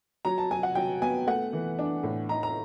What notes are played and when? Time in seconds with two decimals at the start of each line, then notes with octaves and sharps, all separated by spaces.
0.25 F#3 A#5
0.38 A5
0.51 F#3 G#5
0.63 F#5
0.75 F#3 G5
1.01 B3 G#5
1.27 A3 F#5
1.53 E3
1.79 D4
2.03 A2
2.29 D#4 A#5
2.43 A#5